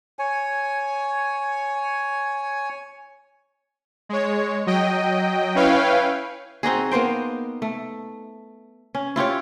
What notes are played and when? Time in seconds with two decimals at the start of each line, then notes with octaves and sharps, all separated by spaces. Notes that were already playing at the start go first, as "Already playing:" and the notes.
0.19 C#5 G#5
4.09 G#3 C#5
4.67 F#3 D#5 G5
5.55 C#4 E4 B4 C#5 F5 G5
6.63 C4 D#4 F#4 G#4
6.91 A#3 B3 C5 G5
7.62 A3
8.95 C#4
9.16 E4 F4 G4 C#5